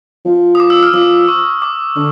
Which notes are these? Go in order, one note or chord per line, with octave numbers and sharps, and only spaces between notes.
F3
D#6
D6
E6
F6
F3 D6
C#6
D6
D3 D6